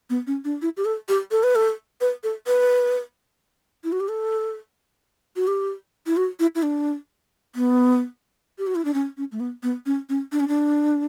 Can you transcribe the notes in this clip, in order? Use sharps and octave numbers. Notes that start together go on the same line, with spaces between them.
B3
C#4
D4
E4
G4
A4
G4
A4
B4
A4
B4
A4
B4
E4
F#4
G4
A4
F#4
G4
E4
F#4
E4
E4
D4
B3
G4
F#4
E4
D4
C#4
C#4
A3
B3
B3
C#4
C#4
D4
C#4
D4